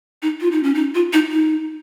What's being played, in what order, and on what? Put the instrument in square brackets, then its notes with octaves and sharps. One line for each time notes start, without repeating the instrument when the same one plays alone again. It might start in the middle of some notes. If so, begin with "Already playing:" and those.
[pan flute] D#4
F4
D#4
C#4
D#4
F4
D#4
D#4